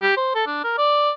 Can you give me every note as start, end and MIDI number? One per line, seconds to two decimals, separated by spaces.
0.02 0.14 67
0.17 0.33 72
0.35 0.44 69
0.47 0.63 62
0.64 0.77 70
0.78 1.10 74